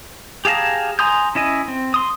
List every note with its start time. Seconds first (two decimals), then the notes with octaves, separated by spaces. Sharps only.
0.45 G4 G#4 F5 A5 A#5
0.99 G#5 A#5 C6 D#6 G6
1.35 C#4 E4 D#5 G#5
1.68 C4
1.94 C6 D#6